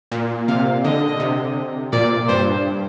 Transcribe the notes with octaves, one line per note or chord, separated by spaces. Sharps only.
A#2
C3 F5
D3 D#5
C3
A#2 D5
G2 C5